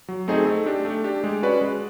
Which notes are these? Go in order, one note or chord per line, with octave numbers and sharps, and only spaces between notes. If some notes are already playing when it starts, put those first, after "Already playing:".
F#3
A3 C4 D#4 G#4
A3
D4 G4
A3
D4 G4
G#3
C#4 F#4 B4 D5
G#3